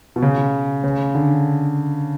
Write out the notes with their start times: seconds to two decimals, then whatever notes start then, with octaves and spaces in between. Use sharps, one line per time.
0.16 B2
0.22 C#3
0.84 C#3
1.15 D3